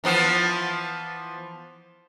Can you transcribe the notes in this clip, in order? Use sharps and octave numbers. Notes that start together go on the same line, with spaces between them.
E3 F3 B3